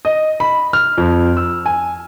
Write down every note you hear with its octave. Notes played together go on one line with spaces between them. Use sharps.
D#5
B5
F6
F2
E6
G#5